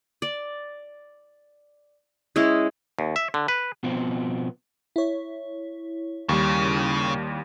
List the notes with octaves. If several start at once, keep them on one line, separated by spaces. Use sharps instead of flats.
D5
G#3 C#4 E4
D#2
E5
D3
B4
B2 F3 B3 C4
E4 C#5
D#2 C#3 G3